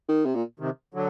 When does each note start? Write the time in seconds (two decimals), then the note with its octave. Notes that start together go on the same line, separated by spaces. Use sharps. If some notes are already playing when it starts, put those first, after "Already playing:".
0.08 D#3
0.26 C3
0.35 A#2
0.60 C3 D#3
0.94 D3 F#3